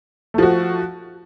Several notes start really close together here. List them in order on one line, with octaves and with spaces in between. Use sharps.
A3 F3 F#4